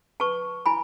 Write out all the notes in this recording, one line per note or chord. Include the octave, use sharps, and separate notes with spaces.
B4 A5 C#6
E4 G#5 B5